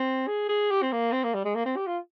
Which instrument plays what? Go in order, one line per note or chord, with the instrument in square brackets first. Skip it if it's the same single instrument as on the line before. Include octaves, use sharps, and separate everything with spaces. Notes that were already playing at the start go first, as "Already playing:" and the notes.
Already playing: [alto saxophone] C4
G#4
G#4
G4
C4
A#3
C4
A#3
G3
G#3
A#3
C4
G4
F4